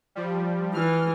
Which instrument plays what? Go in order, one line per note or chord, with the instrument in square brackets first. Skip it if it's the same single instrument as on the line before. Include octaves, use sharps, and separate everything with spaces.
[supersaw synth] F3 G3
[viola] E3 [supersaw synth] F6